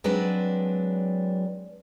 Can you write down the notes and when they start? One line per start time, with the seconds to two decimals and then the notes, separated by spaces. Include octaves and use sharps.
0.04 F#3 G#3 C4 D4 B4 D5